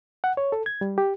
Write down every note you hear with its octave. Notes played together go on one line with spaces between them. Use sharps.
F#5
C#5
A4
G#6
G3
G4